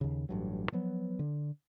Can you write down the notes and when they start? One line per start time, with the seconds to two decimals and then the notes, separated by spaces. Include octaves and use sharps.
0.01 D#2 C#3
0.29 A1 G2 F#3
0.72 F3 F#3 B3
1.19 D3